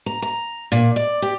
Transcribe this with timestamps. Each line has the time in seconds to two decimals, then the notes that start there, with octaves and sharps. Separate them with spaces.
0.06 A#5
0.22 A#5
0.72 A#2
0.96 D5
1.22 G4